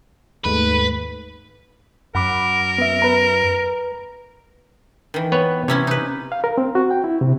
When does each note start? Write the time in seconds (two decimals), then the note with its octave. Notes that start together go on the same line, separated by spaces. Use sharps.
0.45 D#2 G#2 A3 B4
2.15 F#2 A#4 F#5 B5 D6
2.78 B3 E5
3.02 B4 A#5
5.14 D#3 E3
5.32 B3 B4 C#5
5.68 C3 C#4 E4 C#5
5.87 D#4 B4
6.32 F5
6.44 A#4
6.58 C4
6.75 F#4
6.91 G5
7.04 E4
7.21 C3